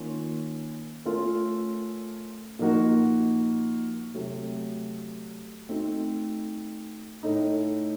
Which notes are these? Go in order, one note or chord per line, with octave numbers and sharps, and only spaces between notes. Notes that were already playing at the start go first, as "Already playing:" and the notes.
Already playing: D#3 A#3 C#4 F4
A3 C#4 F4 A#4
A#2 F3 A#3 D#4 F#4
C3 F#3 A3
A3 C4 D#4 F#4
A2 A3 D#4 A4